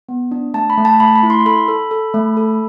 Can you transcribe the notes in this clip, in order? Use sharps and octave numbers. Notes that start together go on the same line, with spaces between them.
B3
D4
A3 A5
B5
A3
A5
A3 B5
B5
E4
C6
A4 B5
A4
A4
A3
A4